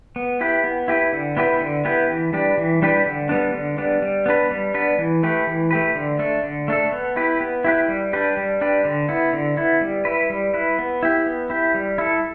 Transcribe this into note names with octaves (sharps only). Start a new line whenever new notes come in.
B3
E4 G4 B4
B3
E4 G4 B4
D3
B3 E4 G4 B4
D3
B3 E4 G4 B4
E3
G3 D4 G4 B4
E3
G3 D4 G4 B4
D3
G3 B3 D4
D3
G3 B3 D4
G3
B3 D4 B4
G3
B3 D4 B4
E3
A3 G4 B4
E3
A3 G4 B4
D3
A3 D4 A4
D3
A3 D4 A4
B3
E4 G4 B4
B3
E4 G4 B4
G3
D4 G4 B4
G3
D4 G4 B4
D3
B3 E4
D3
B3 E4
G3
E4 B4
G3
E4 B4
B3
E4 G4
B3
E4 G4
G3
E4 A4